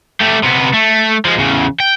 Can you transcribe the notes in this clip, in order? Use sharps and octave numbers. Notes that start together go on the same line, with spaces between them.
A3 G4
C3 B3
A3
F3 G#3
E2 C#3
G5